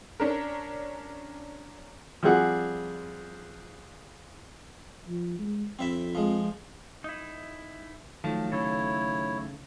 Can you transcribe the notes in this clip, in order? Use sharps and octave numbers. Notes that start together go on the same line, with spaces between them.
C#4 D4 A#4
F3 G3 C4 G#4 F#5
F3
G#3
F2 C4 E4 E5
F3 G#3
D#4 E4
D#3 F3 F#3 A3 A5
C#3 E4 A4 C#5